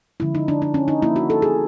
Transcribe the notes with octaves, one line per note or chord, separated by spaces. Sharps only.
D3 F3 G#3 C#4 E4
D#4
D4
D4
C#4
D#4
F3 A#3 C#4 E4
F#4
A4
G#4